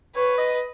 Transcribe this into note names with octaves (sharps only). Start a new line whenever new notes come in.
B4 C#5
D#5